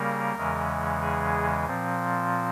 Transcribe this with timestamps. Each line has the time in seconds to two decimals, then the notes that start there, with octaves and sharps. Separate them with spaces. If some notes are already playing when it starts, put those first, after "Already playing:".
Already playing: C#3 G3 A#3 A#4
0.36 E2 C#3 E3 G#3
1.00 G#4
1.66 A#2 F3 C4